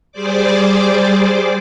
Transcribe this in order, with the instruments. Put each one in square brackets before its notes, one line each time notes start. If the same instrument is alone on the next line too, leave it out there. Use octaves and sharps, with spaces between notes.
[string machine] G3 G#4 C5 D5 D6